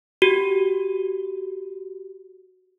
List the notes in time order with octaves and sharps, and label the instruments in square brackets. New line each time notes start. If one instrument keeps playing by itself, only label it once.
[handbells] F#4 G4